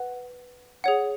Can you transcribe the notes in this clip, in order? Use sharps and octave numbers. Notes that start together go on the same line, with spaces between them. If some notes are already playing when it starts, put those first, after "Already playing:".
Already playing: B4 F#5
G#4 C#5 F#5